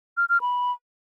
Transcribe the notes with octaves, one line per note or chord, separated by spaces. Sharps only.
F6
F6
B5